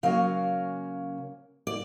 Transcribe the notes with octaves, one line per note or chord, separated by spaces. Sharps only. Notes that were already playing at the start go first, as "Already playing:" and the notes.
C#3 F#3 A#3 C#4 F5
D5